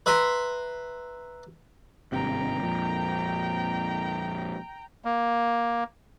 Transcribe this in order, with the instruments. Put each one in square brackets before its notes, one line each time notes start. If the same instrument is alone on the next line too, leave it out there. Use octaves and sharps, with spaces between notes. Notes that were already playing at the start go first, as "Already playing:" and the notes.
[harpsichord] B4 E5 A#5 C6
[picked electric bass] G#1 G2 C3 [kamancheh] G5 A#5
[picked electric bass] F2 A#2
[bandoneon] A#3